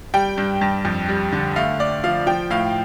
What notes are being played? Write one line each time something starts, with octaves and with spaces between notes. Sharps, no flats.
G3 G5
G2
G2
F2
G3
D3
A3 F5
A3 D5
F3 F5
F3 G5
A2 F5